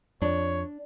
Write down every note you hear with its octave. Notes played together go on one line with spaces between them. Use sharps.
F2 D4 C#5